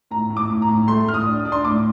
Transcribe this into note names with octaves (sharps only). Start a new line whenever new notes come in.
A2 A#5
A2
D6
A2
A#5
A2
A3 C6
A2 F6
D#6
D4
D#6
D4
C6
A2 D6